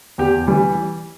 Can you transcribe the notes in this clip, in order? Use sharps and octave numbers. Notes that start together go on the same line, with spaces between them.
E2 G4
E3 G3